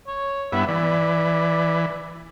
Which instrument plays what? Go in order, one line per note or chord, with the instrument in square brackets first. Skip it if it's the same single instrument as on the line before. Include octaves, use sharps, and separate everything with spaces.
[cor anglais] C#5
[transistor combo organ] G2 B3 E4 [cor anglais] E5
[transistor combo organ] E3 [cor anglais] D5